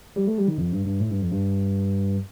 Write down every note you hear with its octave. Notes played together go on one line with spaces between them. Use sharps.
G3
A3
G3
D#3
F2
G2
G2
A2
G2
F2
G2